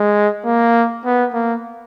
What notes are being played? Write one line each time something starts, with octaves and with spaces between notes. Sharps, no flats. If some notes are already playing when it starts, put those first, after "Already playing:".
Already playing: G#3
A#3
B3
A#3